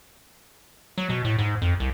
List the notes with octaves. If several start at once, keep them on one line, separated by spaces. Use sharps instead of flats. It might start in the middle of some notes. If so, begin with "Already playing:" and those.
F#3
B2
A2
G#2
F2
C2